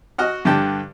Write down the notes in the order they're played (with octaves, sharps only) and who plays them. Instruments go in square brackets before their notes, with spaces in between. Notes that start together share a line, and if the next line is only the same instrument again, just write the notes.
[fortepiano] F#4 D#5 F#5 F6
G2 D3 G4 G5 A5